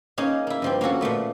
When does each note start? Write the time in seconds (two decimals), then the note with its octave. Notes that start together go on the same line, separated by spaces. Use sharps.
0.18 A#3 C#4 D#4 G#4
0.47 A#3 E4
0.62 G2 F3 C4
0.81 A#3 C#4 F#4 A4
1.01 A#2 F3 A3 B3